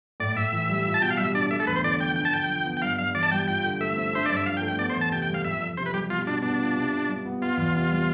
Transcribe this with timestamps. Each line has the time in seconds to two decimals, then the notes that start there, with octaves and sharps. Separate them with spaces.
0.20 A2 D5
0.36 A2 E5
0.52 E3
0.69 G3
0.85 F4
0.94 A5
1.02 B2 G5
1.10 F5
1.17 G3 E5
1.34 D4 D5
1.51 A3 E5
1.60 A4
1.67 E2 B4
1.76 C5
1.84 D3 D5
2.00 F3 G5
2.16 D4 G5
2.25 A5
2.33 D3 G5
2.49 F3
2.66 B3
2.77 G5
2.82 G2 F5
2.98 G2 F5
3.15 E3 D5
3.23 A5
3.31 G3 G5
3.48 F4 G5
3.64 D3
3.80 A3 E5
3.97 C4
4.13 D4 C5
4.26 G2 D5
4.37 E5
4.46 F3 F5
4.57 G5
4.62 A3
4.68 G5
4.79 B3 D5
4.90 C5
4.96 E2
5.01 A5
5.12 C3 G5
5.22 G5
5.29 G3
5.34 F5
5.45 F2 E5
5.61 F2
5.77 C3 C5
5.86 B4
5.93 G3 G4
6.10 B2 F4
6.27 B2 D4
6.43 B3 D4
6.60 F4
6.76 C3
6.93 C3
7.08 G3
7.25 B3
7.41 B3 F4
7.57 E2
7.74 C3
7.90 G3